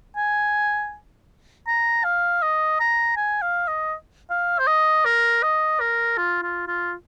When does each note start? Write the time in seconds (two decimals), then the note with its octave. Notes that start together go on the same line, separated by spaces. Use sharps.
0.17 G#5
1.67 A#5
2.04 F5
2.42 D#5
2.80 A#5
3.17 G#5
3.42 F5
3.68 D#5
4.30 F5
4.59 C5
4.67 D#5
5.06 A#4
5.43 D#5
5.81 A#4
6.18 F4
6.43 F4
6.68 F4